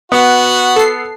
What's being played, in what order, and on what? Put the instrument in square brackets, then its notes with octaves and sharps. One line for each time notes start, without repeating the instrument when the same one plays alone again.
[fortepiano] B3 [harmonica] F#4
[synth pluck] A4 C7